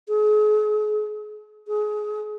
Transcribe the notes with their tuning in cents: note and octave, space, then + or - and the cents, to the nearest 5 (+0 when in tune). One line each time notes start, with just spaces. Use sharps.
G#4 +40
G#4 +25